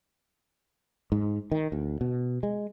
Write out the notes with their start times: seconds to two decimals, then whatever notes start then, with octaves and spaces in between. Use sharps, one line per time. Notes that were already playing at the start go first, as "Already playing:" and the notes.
1.12 G#2
1.52 D#3
1.72 D2
2.01 B2
2.43 G#3